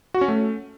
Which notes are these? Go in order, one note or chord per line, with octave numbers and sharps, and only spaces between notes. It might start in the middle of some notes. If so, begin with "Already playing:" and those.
F#4
C#4
A3